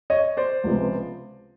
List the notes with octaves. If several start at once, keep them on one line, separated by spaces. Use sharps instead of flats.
C#5 D#5
C5 D5
C#2 C3 F3 G#3 B3